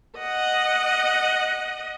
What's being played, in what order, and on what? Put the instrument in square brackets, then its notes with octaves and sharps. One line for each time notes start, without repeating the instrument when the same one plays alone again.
[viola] D#5 F#5